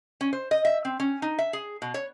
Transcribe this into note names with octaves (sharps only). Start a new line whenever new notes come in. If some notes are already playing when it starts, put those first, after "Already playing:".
C#4
C5
D#5
E5
C4
C#4
D#4
E5
G#4
B2
C#5